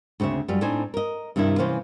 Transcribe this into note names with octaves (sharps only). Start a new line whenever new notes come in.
D2 C#3 C4 C#4 E5
F#2 G3 F4
A2 C4 D4 D#4 C5 G#5
A#4 D#5
G2 C3 D#3 D#4 E4
C3 E3 C#4 C5 F5